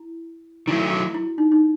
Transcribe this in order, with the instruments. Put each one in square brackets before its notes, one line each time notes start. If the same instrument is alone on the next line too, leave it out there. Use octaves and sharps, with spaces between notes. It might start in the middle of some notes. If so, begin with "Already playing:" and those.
Already playing: [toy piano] E4
[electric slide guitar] D#3 F#3 A3 [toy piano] E4
[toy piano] F#4
E4
D#4
D#4